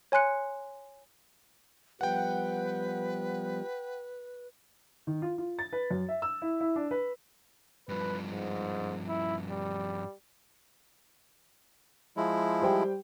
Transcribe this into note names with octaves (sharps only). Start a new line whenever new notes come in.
C#5 G#5 C6 F#6 C#7
F3 G3 B3 B4 F#5 G5
D#3
F4
F4
A6
B4
F#2
E5
E6
E4
E4
D4
B4
G2 F3 B4
G#2
E4
G3
F3 G#3 E4
G3 C5 G5